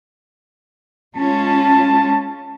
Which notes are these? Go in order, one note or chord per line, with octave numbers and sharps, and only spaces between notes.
G#3 C#4 F4 A5